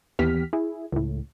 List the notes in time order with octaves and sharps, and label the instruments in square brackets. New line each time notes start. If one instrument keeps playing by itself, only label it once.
[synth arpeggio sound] D#2 E3 B3 G4 F6 B6
E4 G#4
C#2 A2